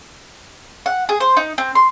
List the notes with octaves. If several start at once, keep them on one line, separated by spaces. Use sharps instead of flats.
F#5
G#4
C5
D#4
C4
C6